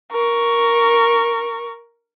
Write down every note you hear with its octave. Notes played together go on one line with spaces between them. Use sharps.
A#4 C#6